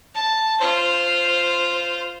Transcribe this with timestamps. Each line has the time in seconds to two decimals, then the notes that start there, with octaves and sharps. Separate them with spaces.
0.14 A5
0.60 F4 C5